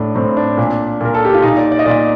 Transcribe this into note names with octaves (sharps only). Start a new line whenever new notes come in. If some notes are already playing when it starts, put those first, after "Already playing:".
Already playing: A2 D4
A2 C4
D4
A#2
A#2 A#4
A4
G4
F4
A#2 D#4
D5
D5
D#5
A#2 D5